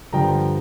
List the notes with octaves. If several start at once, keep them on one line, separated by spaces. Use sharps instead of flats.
G2 D3 F3 G5 A#5